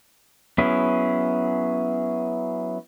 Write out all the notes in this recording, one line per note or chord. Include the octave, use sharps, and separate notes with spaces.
F#3 B3 C#4 E4 G#4